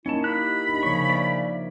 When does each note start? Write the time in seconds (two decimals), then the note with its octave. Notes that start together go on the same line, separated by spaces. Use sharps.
0.06 A#3 C#4 D#4 E4 A5
0.24 G4 B5 F#6
0.69 D4 D#4
0.83 C#3 F3 A#3 C#5 C#6
1.10 A#3 D5 E5